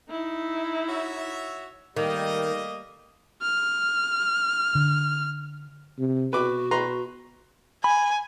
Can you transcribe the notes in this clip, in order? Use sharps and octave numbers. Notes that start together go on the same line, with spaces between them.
D#4 E4
F#4 C#5 E5
D#3 G3 A3 A#3 D#5
F6
D3
C3
B2 F#4 B4 D6
B4 A#5 C6
G#5 B5